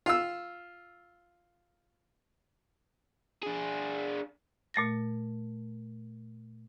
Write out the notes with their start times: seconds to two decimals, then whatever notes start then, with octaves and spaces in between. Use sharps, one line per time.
0.06 F4 E6
3.43 D4 G#4
4.74 A#2 A3 A6 A#6